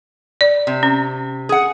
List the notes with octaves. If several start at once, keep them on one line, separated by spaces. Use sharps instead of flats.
D5
C3
C#4
G#4 F#5